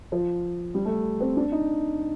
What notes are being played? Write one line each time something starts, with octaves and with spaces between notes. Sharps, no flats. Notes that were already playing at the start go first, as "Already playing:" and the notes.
F3
G3
A3
C4
D4
D#4